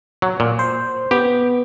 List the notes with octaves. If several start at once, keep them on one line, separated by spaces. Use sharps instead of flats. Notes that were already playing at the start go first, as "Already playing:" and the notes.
F#3
A#2
C5
B3 G4